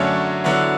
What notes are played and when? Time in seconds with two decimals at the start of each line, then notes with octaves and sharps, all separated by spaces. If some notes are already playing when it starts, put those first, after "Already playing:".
Already playing: F#2 D3 F#3 A3 C#4
0.44 D3 F#3 B3 E4